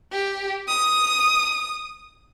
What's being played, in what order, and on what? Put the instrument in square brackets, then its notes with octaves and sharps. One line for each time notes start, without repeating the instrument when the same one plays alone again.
[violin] G4
D#6